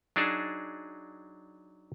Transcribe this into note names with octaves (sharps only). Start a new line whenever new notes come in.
F#3 D4 D#4 G#4 A5